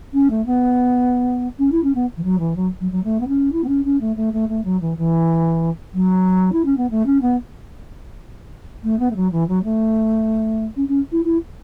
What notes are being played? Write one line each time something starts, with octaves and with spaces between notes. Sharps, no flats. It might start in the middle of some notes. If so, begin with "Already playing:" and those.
C#4
A3
B3
C#4
E4
C#4
B3
E3
F#3
E3
F#3
F#3
F#3
A3
B3
C#4
E4
B3
C#4
C#4
A3
A3
A3
A3
F#3
E3
E3
F#3
E4
C#4
B3
A3
C#4
B3
A3
B3
A3
F#3
E3
F#3
A3
C#4
C#4
E4
E4